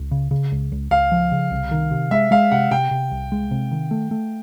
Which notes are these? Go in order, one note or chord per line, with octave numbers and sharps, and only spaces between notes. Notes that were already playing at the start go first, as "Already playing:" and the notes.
Already playing: C#2
C#3
C#3
C#2
C#2
C#2 F5
F3
C#3
C2
D#3
C3
G#3 E5
G#3 F5
C3 F#5
C3 G5
C3
C2
G#3
C3
D#3
A3
A3